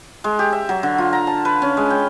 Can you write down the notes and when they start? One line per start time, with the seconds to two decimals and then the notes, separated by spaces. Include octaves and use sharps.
0.24 G#3
0.39 G4
0.53 E5
0.69 F#3
0.83 D3
0.98 F4
1.13 A#5
1.27 A5
1.45 B4
1.62 C#4
1.77 G#3
1.90 G5